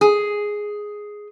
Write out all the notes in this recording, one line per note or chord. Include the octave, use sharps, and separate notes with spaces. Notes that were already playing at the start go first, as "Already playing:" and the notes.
G#4